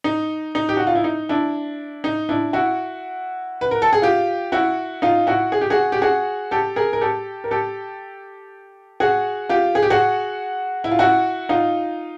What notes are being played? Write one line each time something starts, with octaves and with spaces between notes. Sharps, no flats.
D#4
D#4
G4
F#4
F4
E4
D#4
D4 E4
D#4
D4 E4
E4 F#4
B4
A#4
A4
G#4
F4 G4
E4 F#4
D#4 F4
E4 F#4
G#4
G4
F#4 G#4
G4
F#4 G#4
G4 A4
G#4 A#4
A#4
G4 A4
A#4
G4 A4
F#4 G#4
F4 G4
G#4
G4
F#4 G#4
E4
F4
E4 F#4
D#4 F4